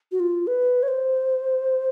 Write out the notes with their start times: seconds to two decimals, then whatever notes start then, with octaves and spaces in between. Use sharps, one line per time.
0.12 F#4
0.20 F4
0.47 B4
0.83 C#5
0.88 C5